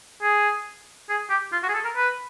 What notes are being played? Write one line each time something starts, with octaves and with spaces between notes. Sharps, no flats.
G#4
G#4
G4
F4
F#4
G#4
A4
A#4
B4